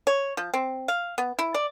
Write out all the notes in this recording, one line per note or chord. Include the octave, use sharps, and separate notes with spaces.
C#5
F3
C4
F5
B3
E4
D5